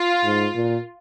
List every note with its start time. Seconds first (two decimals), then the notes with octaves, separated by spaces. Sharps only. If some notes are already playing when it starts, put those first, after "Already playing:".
Already playing: F4
0.24 G#2
0.55 A#2